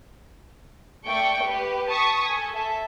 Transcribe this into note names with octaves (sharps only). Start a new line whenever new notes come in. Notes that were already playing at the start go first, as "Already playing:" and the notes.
A3 D5 G5 C#6 D7
G4 B4
A5 C#6 D#6 B6
A4 G#5
A4 E5 A5